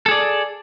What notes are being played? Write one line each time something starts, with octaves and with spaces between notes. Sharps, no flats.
G#4 A4 D5